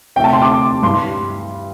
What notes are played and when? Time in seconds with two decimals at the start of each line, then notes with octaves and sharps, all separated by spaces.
0.16 C3 G5
0.20 A3 A5
0.33 C6
0.42 D6
0.83 G2 G3 C6